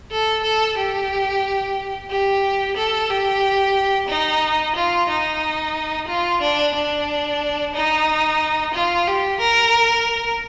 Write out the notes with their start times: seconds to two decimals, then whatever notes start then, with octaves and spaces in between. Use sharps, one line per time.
0.11 A4
0.43 A4
0.77 G4
2.10 G4
2.76 A4
3.10 G4
4.08 D#4
4.76 F4
5.09 D#4
6.08 F4
6.41 D4
6.74 D4
7.74 D#4
8.74 F4
9.07 G4
9.40 A#4